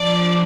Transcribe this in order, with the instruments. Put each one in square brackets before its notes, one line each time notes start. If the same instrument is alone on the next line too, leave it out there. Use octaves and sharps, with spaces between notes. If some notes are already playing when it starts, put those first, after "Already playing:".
Already playing: [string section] F3 D4 D5